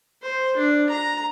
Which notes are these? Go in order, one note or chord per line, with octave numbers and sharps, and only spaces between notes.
C5
D4
A#5